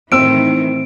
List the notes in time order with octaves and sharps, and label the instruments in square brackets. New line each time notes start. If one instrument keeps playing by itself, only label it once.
[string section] A2 D#3 E3 [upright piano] C4 E6 [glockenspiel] D7